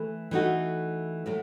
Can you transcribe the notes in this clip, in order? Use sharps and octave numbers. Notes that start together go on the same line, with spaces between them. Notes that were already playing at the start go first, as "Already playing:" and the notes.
Already playing: E3 A3
E3 A3 D#4 F#4
A2 F#3 A3